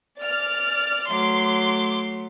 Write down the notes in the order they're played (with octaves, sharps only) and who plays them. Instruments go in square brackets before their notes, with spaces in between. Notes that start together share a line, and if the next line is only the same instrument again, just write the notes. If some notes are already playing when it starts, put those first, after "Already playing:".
[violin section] D5 F6
[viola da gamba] F#3 A3 [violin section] C6 D6